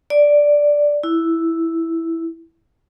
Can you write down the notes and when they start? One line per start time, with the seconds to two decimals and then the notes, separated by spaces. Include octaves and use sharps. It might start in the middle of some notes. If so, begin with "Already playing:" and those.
0.10 D5
1.03 E4